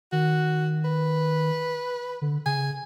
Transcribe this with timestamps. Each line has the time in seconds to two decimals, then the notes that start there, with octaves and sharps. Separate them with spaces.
0.12 D#3 F#4
0.85 B4
2.22 D3
2.46 C#3 G#5